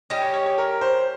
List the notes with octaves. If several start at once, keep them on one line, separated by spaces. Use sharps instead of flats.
G3 C#4 G4 D#5
C#5
C#5
C#5
A#4
C5